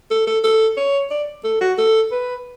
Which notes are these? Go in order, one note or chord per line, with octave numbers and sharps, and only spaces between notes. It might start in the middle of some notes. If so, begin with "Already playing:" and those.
A4
A4
A4
C#5
D5
A4
F#4
A4
B4